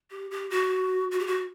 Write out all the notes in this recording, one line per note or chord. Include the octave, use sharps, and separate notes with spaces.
G4
G4
F#4
F#4
G4
F#4